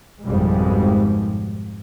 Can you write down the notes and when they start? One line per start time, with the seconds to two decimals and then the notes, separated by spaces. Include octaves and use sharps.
0.24 G#1 F2 G#2 B2 G3 G#3